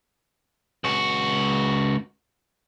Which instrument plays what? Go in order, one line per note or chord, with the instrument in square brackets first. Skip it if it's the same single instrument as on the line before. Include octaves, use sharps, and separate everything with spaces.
[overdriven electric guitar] C#2 F#4